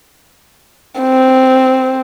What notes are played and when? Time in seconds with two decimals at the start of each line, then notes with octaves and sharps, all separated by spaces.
1.00 C4